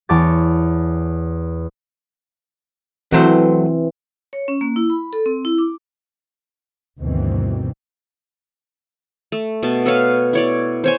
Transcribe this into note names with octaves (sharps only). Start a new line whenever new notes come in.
E2 C#5 A5 D6 A6
E3 F#3 A3 C4 C5
C#5
C#4
A#3
E4
B5
A4
C4
E4
D6
D2 G2 B2 D#3 E3 C4
A3
B2 A5
A4 B4 C#5 F5
E4 C#5 D5
C5 C#5 G#5